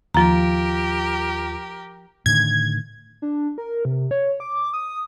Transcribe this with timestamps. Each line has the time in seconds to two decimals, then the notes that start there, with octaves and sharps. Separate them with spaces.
0.14 D#2 F3 F4 G4 A#4 A#5
2.26 A2 D3 D#3 G#6
3.22 D4
3.58 A#4
3.85 C3
4.11 C#5
4.40 D6
4.74 D#6